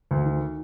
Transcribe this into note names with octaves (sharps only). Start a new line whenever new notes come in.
D2
D#3